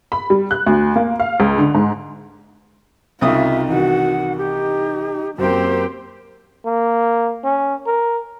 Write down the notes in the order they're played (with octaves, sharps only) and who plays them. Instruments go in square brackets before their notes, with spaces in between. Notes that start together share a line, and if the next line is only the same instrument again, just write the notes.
[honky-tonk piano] B5
G3
F#6
D2
A#3
F5
C#2
D3
G#2
[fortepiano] C2 C#3 D#6 [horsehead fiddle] D#4 F4 [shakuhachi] E5
[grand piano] D#3 E3 [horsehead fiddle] F#4 [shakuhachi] F#5
[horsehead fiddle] D#4 [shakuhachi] G4
[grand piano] F#2 A#3 [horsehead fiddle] C4 G4 [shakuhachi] C5
[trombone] A#3
C#4
A#4